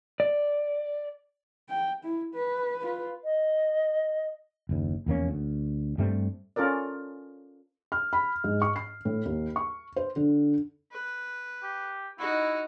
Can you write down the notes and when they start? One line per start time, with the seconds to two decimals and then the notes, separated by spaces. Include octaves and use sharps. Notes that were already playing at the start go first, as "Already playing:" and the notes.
0.20 D5
1.69 G5
2.05 E4
2.34 B4
2.83 F4 B4
3.24 D#5
4.69 F#1 D#2
5.06 F1 E2 A#3 C#4
5.28 D2
5.98 G2 G3 A3 C4
6.56 C#4 F4 A4 A#4 D5
7.92 F6
8.13 B5
8.44 G#2
8.62 C#6
8.76 C7
9.05 A2
9.25 D#2
9.56 C#6
9.96 C5
10.16 D3
10.92 B4
11.63 G4
12.18 D#4 E4 F#4